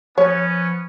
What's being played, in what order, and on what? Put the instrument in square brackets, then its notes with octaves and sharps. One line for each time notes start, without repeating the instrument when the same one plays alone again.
[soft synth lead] F3 [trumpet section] B3 C#4 [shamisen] C#5